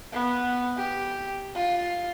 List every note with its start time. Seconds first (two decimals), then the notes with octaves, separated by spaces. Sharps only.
0.12 B3
0.77 G4
1.55 F4